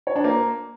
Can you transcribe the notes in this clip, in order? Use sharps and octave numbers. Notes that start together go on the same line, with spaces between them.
C#5
D4
A#3